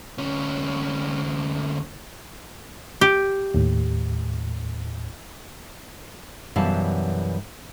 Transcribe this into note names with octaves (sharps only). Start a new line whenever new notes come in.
D2 C#4
G4
D#2 A2
F#2 B2 E3 G3 F5 A5